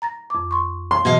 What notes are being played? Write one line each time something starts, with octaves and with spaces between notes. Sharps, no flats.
A#5 A6 A#6
F2 D6
C6 C#6
C6
G#2 B2 E3 D#5 F5